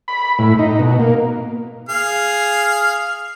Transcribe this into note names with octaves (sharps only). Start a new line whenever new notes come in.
B5
A2
D#4
B2
A#3
G#4 F5